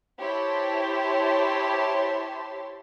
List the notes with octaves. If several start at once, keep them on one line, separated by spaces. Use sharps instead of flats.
E4 G4 C5 C#5 A5 C6